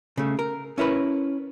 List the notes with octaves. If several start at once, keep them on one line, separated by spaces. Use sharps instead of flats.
C#3 A3
A#4
C#4 E4 A#4 B4